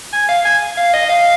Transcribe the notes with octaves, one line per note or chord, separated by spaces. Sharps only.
G#5
F5
G#5
F5
D#5
F5